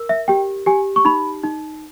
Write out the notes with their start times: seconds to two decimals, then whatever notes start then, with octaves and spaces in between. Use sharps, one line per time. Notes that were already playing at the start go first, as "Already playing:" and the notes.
Already playing: A#4
0.09 E5
0.28 G4 G5
0.66 G4 G#5
0.96 C#6
1.05 D#4 B5
1.43 D#4